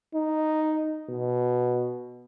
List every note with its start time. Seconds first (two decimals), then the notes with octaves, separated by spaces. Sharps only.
0.14 D#4
1.10 B2